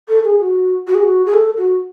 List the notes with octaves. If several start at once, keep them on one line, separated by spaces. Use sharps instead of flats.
A4
G#4
F#4
F#4
G#4
F#4
G#4
A4
F#4